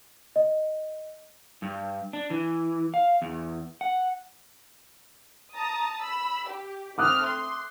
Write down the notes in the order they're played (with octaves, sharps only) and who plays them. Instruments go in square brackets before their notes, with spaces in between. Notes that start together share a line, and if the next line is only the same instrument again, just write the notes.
[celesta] D#5
[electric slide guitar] G2
D4
E3
F5
E2
F#5
[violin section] A5 A#5 D#6
B5 E6
G4
[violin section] A3 C4 F6 [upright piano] D6 D#6 F#6
[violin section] C6